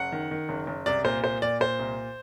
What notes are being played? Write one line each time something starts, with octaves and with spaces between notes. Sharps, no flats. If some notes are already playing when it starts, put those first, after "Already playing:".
Already playing: F#1 F#5
D#3
D#3
F#1
F#1
C2 D5
A#2 C5
A#2 C5
A#2 D5
A#2 C5
C2